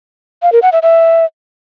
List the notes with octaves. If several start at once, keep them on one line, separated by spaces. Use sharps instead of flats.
F5
A#4
F#5
E5
E5